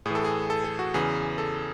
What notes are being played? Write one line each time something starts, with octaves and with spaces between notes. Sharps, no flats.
A2 E3 G#4 A4
G#4
A4
A4
F#4
E2 C#3 E3 G#4
A4